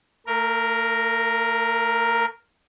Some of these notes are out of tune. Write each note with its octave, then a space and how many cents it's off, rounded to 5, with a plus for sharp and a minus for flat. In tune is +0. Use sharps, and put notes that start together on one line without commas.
A3 +45 A#4 +0